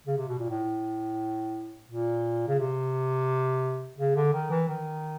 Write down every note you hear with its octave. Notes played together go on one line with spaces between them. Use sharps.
C#3
C3
B2
A#2
A2
A#2
C#3
C3
C#3
D3
D#3
E3
D#3